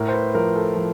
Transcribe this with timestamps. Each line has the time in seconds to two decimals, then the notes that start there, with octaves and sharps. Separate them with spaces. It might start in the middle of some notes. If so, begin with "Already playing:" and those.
Already playing: A2 A#4
0.08 C5
0.13 B4
0.35 F3 A#4
0.56 A4
0.76 F3